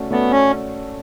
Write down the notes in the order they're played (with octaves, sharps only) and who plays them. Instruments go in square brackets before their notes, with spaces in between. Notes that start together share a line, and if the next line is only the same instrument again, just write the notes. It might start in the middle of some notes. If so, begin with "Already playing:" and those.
Already playing: [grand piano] A3 C#4 F#4 A4 D5
[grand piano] A3 C#4 F#4 A4 D5 [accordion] B3
[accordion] C#4